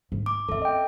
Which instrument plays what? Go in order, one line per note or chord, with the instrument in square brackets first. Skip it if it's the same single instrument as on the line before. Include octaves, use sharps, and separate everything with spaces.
[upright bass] G#2
[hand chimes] D6
[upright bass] C4 C#4 [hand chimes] A4 E5
[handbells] D#5 G5